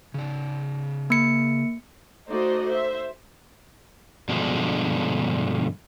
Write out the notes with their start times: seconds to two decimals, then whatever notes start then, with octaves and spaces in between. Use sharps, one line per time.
0.14 C#3 D5
1.10 A#3 C#7
2.29 A3 D#4 F#4 C5 D5 D#5
2.68 C5 E5
4.29 G2 B2 D3 F3 G#3